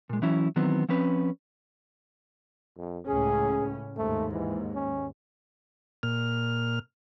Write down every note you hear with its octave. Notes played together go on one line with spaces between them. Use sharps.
A#2 G#3
E3 F#3 C#4 E4
D#3 E3 F#3 B3 C4
F3 C4 C#4 B4
F2
C#2 A2 C#4 G#4
D#2 G#2 A3
E3
C#4
A#2 F6